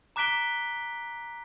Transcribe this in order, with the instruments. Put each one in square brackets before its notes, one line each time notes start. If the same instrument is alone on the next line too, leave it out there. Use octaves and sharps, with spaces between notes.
[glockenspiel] A#5 D6 F#6 B6 D7 G7